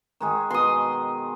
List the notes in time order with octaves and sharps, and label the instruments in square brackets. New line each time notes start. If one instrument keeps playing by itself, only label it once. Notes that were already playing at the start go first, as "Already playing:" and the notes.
[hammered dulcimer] D#3 G#3 G#4
[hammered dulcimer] B2 [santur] C6 D#6